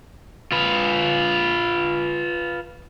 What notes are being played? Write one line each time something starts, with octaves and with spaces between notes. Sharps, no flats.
F4 B4